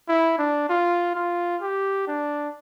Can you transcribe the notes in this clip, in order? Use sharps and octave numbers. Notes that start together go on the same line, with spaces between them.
E4
D4
F4
F4
G4
D4